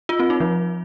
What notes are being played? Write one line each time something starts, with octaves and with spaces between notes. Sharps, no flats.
F4
C4
D#4
F3